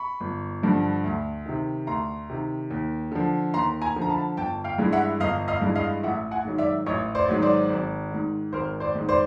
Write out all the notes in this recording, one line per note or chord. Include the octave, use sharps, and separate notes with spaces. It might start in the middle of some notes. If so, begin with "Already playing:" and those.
Already playing: B5 C#6
G1
G2 D3 F3
D2
C3 D#3
D2 A#5 C6
C3 D#3
D#2
D3 F3
D#2 A#5 C6
G#5 A#5
D3 F3
A#5
A5 B5
G1 G5 A5
F5 G5
G2 E3 G#3
E5 F#5
G1 D#5 F5
D#5 F5
G2 E3 G#3
D#5 F5
A1 E5 F#5
F#5 G#5
G#2 D#3 F#3
D5 E5
A1 C#5 D#5
C5 D5
G#2 D#3 F#3
C5 D5
G#1
G#2 D#3
G#1 A#4 C5
C5 D5
G#2 D#3
C5 D5